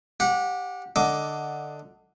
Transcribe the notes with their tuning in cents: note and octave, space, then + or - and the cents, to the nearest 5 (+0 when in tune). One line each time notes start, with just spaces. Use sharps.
G4 +0 F#5 -30
D3 +10 D#5 +20 D6 +0